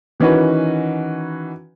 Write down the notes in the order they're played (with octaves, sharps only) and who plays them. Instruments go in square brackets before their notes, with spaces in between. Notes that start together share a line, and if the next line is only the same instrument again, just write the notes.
[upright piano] D#3 E3 C#4 D#4 F#4 B4